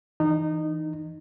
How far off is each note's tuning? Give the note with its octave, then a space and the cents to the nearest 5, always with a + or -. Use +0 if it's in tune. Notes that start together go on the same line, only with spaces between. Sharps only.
E3 -15 D#4 -20